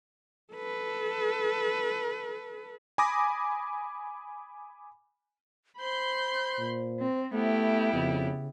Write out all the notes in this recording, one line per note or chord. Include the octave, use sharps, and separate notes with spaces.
A4 B4
G#5 B5 D6 D#6 A#6
C5 B5 C6 G6
A#2
C4
A3 B3 E4 G4
F2 C#3